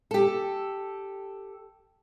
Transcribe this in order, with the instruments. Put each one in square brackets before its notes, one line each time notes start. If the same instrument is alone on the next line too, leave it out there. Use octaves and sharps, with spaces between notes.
[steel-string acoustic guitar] G4 A4